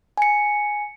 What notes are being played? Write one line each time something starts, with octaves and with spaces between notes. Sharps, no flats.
G#5 C#7